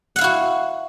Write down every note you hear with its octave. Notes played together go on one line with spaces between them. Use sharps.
E4 F#4 F5 F#5